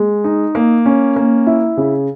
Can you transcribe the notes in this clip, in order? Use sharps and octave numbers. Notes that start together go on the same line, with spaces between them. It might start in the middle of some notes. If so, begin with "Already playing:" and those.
Already playing: G#3
D#4
A#3
C#4
A#3
E4
C#3